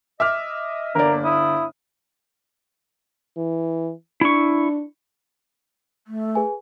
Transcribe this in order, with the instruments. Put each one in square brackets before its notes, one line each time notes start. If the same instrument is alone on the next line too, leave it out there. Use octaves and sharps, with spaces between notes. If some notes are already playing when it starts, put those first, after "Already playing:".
[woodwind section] D#5 [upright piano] E5 D6 F6
[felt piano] G1 D5 [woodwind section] A#3 [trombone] A#4
[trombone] E4 [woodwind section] D#6
[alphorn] E3
[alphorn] D4 [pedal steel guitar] E4 C#6
[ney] A3
[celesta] G#4 B4 G#5